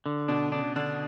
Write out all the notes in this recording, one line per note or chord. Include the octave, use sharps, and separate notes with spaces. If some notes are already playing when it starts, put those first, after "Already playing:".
D3
B2 D4
C#3 D4
D3 D4